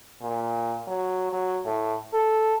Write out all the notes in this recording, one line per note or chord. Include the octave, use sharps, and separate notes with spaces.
A#2
F#3
F#3
A2
A4